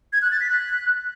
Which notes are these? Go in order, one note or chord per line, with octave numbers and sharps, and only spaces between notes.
G#6
F#6
A6
B6
F#6